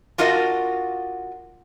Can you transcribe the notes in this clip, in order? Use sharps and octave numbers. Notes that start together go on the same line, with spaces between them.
D4 F4 F#4 A#4 D#5